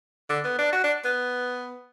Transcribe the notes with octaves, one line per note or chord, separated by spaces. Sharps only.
D3
B3
D4
F#4
D4
B3